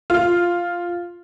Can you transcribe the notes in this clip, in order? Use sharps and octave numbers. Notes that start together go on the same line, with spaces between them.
F4